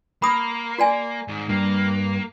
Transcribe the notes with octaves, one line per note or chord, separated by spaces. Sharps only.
A#3 B5 D#6
F#4 D5 G#5
G#2 D#3
G2 A#3